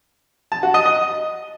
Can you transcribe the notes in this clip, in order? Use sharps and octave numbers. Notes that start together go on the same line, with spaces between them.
A5
F#4
D#5
D#5